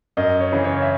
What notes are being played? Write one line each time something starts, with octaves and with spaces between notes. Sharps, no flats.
F#2 D#5
C#5
C#3 E3
C#5
E5